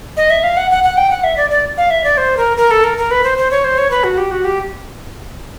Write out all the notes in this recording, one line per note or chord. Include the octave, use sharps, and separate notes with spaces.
D#5
E5
F5
F#5
F#5
F#5
G5
F#5
E5
D5
D5
F5
E5
D5
C5
A#4
A#4
A4
A#4
A#4
B4
C5
C5
C#5
C5
C#5
B4
F#4
G4
F#4
G4